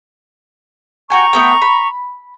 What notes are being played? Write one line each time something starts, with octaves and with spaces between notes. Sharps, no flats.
F#4 G5 G#5 A#5 C#6
A3 B3 G5
B5